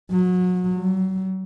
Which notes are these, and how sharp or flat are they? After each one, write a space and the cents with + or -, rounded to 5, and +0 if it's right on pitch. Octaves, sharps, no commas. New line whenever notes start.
F#3 -30
F#3 +35